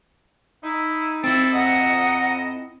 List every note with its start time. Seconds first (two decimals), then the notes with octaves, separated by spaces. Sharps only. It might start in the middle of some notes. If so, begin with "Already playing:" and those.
0.63 D#4 E4
1.24 C4 E4 A4 A6
1.53 F2 D#5 F#5 A#5